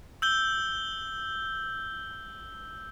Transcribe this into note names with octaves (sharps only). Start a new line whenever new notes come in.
E6 G6 G7